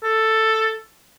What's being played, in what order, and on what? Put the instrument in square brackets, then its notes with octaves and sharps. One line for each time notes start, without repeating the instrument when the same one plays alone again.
[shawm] A4